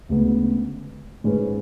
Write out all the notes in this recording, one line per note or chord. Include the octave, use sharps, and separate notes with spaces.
D2 C#3 G#3 B3
G#2 G#3 C#4 G#4 B4